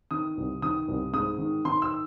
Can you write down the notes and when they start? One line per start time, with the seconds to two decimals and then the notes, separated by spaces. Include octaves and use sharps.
0.11 D#3 D#6
0.37 C2
0.62 D#3 D#6
0.88 C2
1.13 G#2 D#6
1.38 D#3
1.65 D#3 C6
1.82 E6